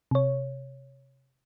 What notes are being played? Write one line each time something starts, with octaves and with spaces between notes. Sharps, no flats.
C3 C#5